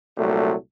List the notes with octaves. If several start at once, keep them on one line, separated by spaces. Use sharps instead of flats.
C2 A#2 F#3 A3